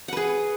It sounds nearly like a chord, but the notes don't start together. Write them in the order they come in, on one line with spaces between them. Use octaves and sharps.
F#5 B4 G#4